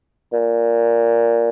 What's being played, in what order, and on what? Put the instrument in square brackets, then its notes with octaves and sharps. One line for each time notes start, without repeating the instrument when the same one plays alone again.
[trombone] A#2